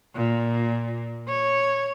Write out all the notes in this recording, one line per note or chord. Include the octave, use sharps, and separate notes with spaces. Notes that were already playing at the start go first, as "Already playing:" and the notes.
A#2
C#5